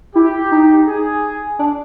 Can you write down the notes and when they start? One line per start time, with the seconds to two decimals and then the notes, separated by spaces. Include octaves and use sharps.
0.15 E4 G4
0.52 D#4
0.87 G#4
1.59 D4